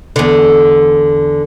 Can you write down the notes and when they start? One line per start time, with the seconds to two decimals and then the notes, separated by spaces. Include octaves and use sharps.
0.16 E2 D3